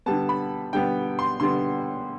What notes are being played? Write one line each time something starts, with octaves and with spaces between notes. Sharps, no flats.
D3 G3 B3 A5
B5
D3 G3 B3 G5
C6
D3 G3 B3 C6